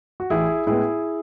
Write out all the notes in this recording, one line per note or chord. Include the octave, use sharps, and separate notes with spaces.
F#4
A1 E4 G#4
A2 G#3 B3 E4 G#4